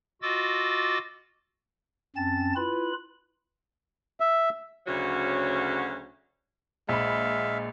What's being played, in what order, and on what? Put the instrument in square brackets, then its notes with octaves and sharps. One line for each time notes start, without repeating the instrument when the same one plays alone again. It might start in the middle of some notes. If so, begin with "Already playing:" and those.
[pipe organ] F4 F#4 D#5 D6 E6 A6
F#2 C4 C#4 A5 A6
E4 F4 B4 B5
[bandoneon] E5
[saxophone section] D2 C#3 F#3 C#4 F#4
[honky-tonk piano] A#1 B5 [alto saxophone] G#3 [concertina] E5 F5